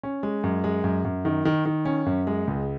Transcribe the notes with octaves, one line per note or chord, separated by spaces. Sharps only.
C#4
G#3
F#2
G#3
F#2
F#2
D#3
D#3
D#3
C#4
F#2
G#3
C#2